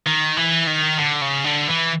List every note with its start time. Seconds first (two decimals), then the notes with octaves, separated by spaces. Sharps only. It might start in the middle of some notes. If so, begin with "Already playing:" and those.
0.06 D#3
0.37 E3
0.67 D#3
0.98 D3
1.21 C#3
1.44 D3
1.68 E3